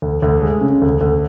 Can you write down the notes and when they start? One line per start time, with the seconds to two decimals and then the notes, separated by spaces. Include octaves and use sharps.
0.02 D2
0.22 D2
0.42 G#3
0.61 C#3
0.82 D2
1.01 D2